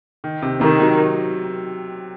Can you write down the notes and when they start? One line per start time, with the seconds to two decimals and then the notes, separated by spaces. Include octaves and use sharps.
0.24 D#3
0.42 C3
0.61 C3 D#3
0.80 F#3